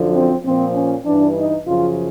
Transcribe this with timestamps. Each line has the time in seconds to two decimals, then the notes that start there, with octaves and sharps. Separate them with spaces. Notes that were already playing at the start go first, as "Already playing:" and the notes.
Already playing: F#2 D3 F3
0.13 C4
0.44 A#2 F3 C4
0.75 C#4
1.06 G2 E3 D4
1.37 D#4
1.67 F#2 C#3 F3 F4